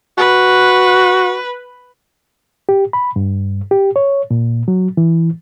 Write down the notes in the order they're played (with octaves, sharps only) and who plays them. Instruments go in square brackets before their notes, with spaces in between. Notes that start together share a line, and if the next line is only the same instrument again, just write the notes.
[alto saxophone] F#4 [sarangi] B4
[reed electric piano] G4
B5
G2
G4
C#5
A#2
F#3
E3